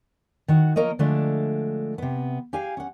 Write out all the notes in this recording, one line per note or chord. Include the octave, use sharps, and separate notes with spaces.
D#3 F#4
F3 A#3 A#4 C#5 D#5
D3 F3 G#3 A3 D4
C3 B3
G4 G#4 F5 G#5
C#4 F#5